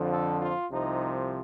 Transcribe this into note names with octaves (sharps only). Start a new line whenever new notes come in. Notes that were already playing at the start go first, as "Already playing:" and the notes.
Already playing: F2 D3 F3
A4
F4
C2 C3 F3 D#4